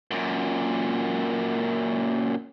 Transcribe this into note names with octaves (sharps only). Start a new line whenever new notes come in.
F#2 A#2